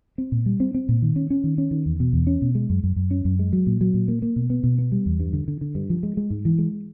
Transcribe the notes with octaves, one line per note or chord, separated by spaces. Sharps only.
C4
A#2
G3
C4
C4
A#2
D#3
C#4
C#4
D#3
C#4
D#3
E2
B2
E2
C#4
B2
G#3
F#2
F#2
F#2
C#4
F#2
G#3
F#3
A#2
F#3
A#2
A#3
A#3
B2
B3
B2
B3
G3
E2
G2
D3
D3
D3
G2
F3
G#3
G#3
G#2
E3
G#3